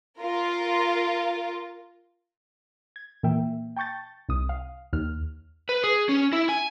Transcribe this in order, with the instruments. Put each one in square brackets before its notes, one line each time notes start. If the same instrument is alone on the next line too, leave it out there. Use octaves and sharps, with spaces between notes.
[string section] F4 A#4
[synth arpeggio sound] G#6
A#2 E3 A#3 E5 G5
G5 A5 C#6 G6 A6
C2 D#6
F5
D#2 F6
[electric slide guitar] B4
G#4
C#4
E4
G#5